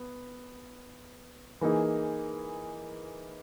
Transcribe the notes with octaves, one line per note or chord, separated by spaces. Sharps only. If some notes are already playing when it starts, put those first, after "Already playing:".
Already playing: B3
E3 A#3 D#4 G#4